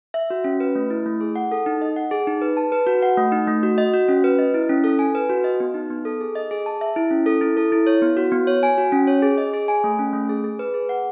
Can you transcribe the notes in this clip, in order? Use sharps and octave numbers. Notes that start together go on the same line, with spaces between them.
E5
F#4
C#4
B4
A3
E4
A3
G#4
F#5
A4
D#4
D#5
F#5
G#4
D#4
B4
A5
B4
F#4
F#5
A3
D#4
A3
F#4
D#5
F#4
C#4
B4
D#5
E4
C#4
A4
G#5
B4
F#4
D#5
B3
D#4
B3
A4
G#4
D#5
G#4
A5
E5
E4
C#4
A4
E4
A4
E4
C#5
B3
F#4
B3
C#5
G#5
F#4
C#4
C#5
G#4
D#5
G#4
G#5
A3
C#4
A3
G#4
G#4
B4
G#4
F#5